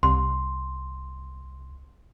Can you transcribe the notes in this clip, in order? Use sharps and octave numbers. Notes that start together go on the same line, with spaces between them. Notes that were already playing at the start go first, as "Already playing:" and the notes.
C2 C6